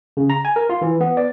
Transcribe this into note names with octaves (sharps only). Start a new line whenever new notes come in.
C#3
A#5
G#5
A#4
F4
E3
B3
D5